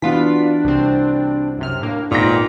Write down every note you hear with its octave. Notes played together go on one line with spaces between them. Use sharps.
E3 B3 D4 F4 F#4 B6
C2 C4
F#2 C3 F6
A2 A#3 D4
G#1 A#2 G#3 B3 D#4 G5 A#6